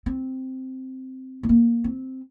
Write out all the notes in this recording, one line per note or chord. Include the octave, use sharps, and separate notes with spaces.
C4
A3
A#3
C4